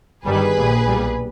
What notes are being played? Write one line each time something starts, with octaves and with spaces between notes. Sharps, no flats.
G1 G2 D#3 G3 G#4 B4
A#1 A#2 G3
B1 A#2 G3